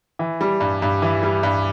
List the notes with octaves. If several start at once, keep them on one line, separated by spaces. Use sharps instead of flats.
E3
G3
G2
G2
E3
G3
G2